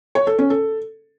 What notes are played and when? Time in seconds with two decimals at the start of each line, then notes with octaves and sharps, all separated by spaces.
0.15 C#5
0.27 A4
0.38 C#4
0.50 A4